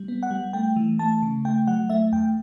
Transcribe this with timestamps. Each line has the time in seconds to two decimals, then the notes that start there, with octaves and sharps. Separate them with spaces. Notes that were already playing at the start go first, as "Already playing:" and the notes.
Already playing: G3
0.08 B3
0.23 F#5
0.31 G3
0.53 A3 G5
0.76 E3
0.99 A3 A5
1.22 C#3
1.45 A3 G5
1.67 F#3 F#5
1.89 A3 E5
2.12 E2 G5